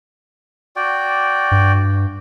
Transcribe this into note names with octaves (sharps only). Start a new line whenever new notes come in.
F#4 D5 G5
G2